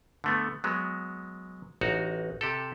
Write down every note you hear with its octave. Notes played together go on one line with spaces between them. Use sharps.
D3 A3 B3
F#3 G#3 B3
A1 D#4 F#4 A#5
C3 G4 A4